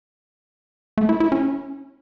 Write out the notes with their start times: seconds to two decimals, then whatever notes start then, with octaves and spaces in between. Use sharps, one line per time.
0.98 A3
1.09 E4
1.20 E4
1.32 C#4